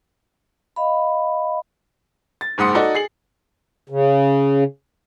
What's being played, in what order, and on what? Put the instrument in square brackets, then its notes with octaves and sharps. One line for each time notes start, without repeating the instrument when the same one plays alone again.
[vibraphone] D#5 F5 B5
[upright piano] A6
F#1 G#2 F#5 C6 D#6 C#7
D#4 F#4 A4 D5 D#5
G#4 C7 F#7
[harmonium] C#3